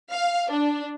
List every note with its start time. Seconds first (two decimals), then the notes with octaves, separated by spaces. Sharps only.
0.11 F5
0.51 D4